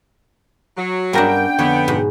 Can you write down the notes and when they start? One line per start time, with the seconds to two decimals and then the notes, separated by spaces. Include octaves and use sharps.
0.77 F#3
1.13 G2 B3 C#4 D4 A#4 G5 A#5
1.59 F2 D3 B3 C#5 F#5
1.88 G#2 B2